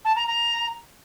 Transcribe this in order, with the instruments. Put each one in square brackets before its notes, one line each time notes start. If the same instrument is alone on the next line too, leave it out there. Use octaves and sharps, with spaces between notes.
[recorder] A5
A#5
A#5